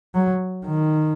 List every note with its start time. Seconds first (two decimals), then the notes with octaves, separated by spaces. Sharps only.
0.15 F#3
0.66 D#3